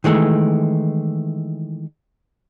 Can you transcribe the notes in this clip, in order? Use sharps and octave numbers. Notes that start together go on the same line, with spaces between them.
D#3 E3 G#3 A3